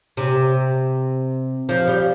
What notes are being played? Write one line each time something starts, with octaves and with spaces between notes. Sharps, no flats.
C3
F3
G3